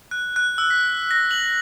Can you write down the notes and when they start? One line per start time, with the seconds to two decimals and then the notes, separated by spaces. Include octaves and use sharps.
0.11 F#6
0.36 F#6
0.58 E6
0.70 B6
1.11 A#6
1.31 F#7